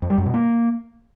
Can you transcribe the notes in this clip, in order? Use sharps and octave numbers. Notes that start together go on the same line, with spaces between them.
F2
G3
F#2
B2
A#3